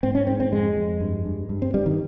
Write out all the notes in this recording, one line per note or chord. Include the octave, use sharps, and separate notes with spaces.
G#2 C4
C#4
G#2 C4
C4
F2 G#3
F2
G2
G2
G2
C4
G2 G3
D#3